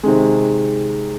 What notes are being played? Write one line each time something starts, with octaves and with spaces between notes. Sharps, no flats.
C3 D#3 G#3